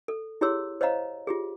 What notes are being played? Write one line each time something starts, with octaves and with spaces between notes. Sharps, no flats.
A4
E4 G4 G#4 C#5 C6 E6
C5 C#5 D#5 F5 A#5
F4 G4 G#4